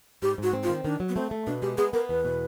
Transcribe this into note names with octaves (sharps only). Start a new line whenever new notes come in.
G#2 G4
G#2 F#4
C4
F4
D#3
D#3 D4
F#3
B3
A3 C4
A3
B2 D4
G#3 G4
B3 G#4
B3 A#4
E2 B4
B2